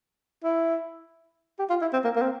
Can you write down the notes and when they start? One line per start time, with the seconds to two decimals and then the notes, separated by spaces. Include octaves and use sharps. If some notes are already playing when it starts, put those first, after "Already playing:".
0.44 E4
1.59 G4
1.70 F4
1.82 E4
1.93 C4
2.04 A#3
2.16 A#3
2.22 C4